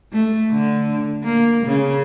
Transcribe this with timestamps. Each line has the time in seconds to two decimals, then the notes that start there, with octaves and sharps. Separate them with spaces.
0.13 A3
0.51 D3
1.23 A#3
1.66 C#3